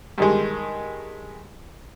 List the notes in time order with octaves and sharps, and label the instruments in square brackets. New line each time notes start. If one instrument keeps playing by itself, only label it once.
[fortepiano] G2 D#3 G#3